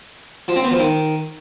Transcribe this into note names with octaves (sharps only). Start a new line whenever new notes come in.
F3
C4
B3
F3
D#3